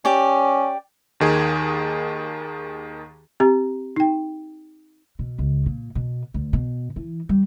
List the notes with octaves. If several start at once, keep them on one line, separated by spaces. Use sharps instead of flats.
C#4 G4 D5
D#2 D#3 G#4 G#6
C4 G4 A#5
D#4 G5
B2
C#2
A#2
B2
D2
B2
E3
G3